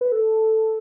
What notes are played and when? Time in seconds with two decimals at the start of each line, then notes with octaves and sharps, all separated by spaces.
0.01 B4
0.12 A4